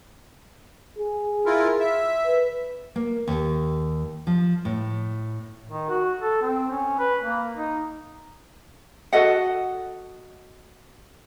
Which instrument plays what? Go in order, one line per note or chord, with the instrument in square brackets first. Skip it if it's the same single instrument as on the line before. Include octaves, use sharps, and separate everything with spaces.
[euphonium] G#4
[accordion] E4 F4 A#4
E5
[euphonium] B4
[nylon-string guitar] A#3
D#2
F3
A2
[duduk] D#3
F#4
A4
C4
C#4
B4
A#3
D#4
[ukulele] F#4 A4 D#5 F#5